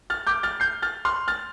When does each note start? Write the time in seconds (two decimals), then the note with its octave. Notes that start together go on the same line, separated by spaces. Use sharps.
0.10 F6 A6
0.27 D6 G6
0.43 F6 A6
0.60 G6 C7
0.82 F6 A6
1.05 C6 F6
1.28 F6 A6